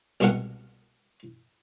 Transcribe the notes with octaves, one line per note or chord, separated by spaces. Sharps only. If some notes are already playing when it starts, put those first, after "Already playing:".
C2 B2 G#3 A#4 F#5